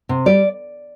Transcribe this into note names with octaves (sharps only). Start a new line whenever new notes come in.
C3
G3 D5